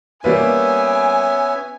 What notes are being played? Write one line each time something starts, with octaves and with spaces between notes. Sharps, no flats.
G3 A#3 B3 C#4 B4 E5 G#5